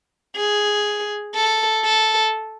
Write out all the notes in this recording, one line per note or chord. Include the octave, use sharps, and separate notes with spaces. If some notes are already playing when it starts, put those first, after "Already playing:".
G#4
A4
A4